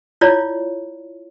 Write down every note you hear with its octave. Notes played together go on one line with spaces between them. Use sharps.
E4 F4 C#5 D5